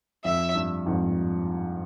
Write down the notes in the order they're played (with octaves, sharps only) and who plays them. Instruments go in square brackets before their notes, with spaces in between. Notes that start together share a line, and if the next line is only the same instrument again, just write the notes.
[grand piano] F2 [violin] E5
[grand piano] G2
F2 G#2